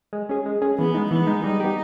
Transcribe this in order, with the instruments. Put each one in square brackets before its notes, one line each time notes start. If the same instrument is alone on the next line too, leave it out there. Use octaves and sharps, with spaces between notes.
[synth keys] G#3
C#4 G#4
G#3
C#4 G#4
[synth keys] E3 [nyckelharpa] B3
[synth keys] G#3 D#4
[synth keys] E3 [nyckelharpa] B3
[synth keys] G#3 D#4
[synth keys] G3 [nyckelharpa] D#4
[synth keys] B3 G4